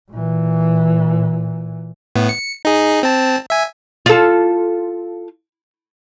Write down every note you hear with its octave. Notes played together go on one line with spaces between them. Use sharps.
A#2 E3
A2 B3
C#7
D#4 G#4
C4 A5
E5 G#5
F4 A4